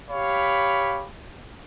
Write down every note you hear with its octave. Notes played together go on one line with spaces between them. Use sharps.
G4 C#5 F5 B5